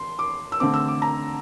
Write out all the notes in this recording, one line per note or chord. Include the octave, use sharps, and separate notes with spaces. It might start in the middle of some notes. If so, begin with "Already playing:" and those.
Already playing: C6
D6
E6
D3 A3 C4 D6
E6
D6
A#5